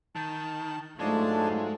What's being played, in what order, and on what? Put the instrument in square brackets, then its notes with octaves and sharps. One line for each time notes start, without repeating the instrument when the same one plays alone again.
[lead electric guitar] D#3 [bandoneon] A5
[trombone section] G#2 F#3 F4 [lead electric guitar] G#3 [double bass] A3 [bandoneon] D4 A5